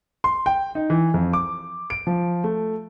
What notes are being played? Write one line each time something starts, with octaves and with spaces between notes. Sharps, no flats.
C6
G5
D#4
E3
F2
D6
D7
F3
A3